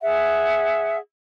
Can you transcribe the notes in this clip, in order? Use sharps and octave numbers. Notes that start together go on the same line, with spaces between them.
G#4 E5 F#5